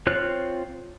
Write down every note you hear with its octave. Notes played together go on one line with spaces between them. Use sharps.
C4 F4 C#5 F6 F#6